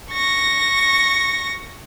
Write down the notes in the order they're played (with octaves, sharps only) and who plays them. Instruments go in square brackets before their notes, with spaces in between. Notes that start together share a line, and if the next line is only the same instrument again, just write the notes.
[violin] C#6 A#6